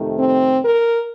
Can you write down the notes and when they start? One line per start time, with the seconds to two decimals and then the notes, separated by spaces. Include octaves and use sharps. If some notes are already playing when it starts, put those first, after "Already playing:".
Already playing: F2 C3 D#3 A3
0.18 C4
0.61 A#4